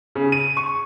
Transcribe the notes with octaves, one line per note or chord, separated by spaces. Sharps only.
C#3
D#7
C#6